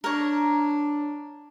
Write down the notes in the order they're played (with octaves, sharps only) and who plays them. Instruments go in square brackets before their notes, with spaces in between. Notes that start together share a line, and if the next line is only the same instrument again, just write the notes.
[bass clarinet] D4 [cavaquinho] A#4 C#5